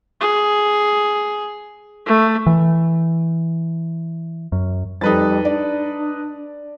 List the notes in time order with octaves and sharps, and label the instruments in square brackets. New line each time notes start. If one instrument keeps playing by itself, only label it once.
[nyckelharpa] G#4
A3
[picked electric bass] E3
F#2
[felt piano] F2 A4 [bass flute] G3 [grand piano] D#4 B4 A6
[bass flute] D4 [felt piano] D5